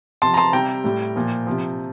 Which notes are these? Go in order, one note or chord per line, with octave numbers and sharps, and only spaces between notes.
C3 F3 A5 C6
A#5
A5 C6
C3 G3 G5 A#5
A2 G3
A#2 F3
C3 F3